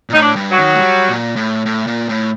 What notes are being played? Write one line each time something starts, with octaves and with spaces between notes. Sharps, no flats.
A#2
A2 D#4
D4
G2
F#3
D#3
A3
G3
A#2
A2
A2
A#2
A2